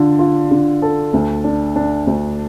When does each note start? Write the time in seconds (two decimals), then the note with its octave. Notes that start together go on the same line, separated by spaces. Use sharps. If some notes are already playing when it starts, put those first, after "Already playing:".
Already playing: D3 F4
0.19 F4
0.51 D3
0.82 A4
1.13 D2
1.44 D4
1.76 D4
2.07 D2